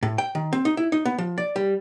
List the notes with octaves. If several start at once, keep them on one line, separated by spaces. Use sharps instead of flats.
A2
G5
D#3
C4
D#4
E4
D#4
B3
F3
D5
G3